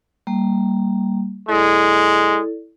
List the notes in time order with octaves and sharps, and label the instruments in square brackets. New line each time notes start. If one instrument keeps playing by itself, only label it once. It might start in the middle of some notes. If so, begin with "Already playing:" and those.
[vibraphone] G3 A#3
[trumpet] G#3 [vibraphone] E4 A4 D5